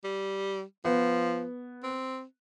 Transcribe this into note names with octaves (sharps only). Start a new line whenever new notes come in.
G3
F3 B3
C4